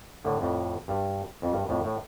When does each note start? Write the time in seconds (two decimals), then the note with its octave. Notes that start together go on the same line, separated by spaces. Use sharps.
0.25 A2 D3
0.41 F2 A2
0.88 G2
1.42 F2
1.52 G2
1.69 F2 A2
1.84 A2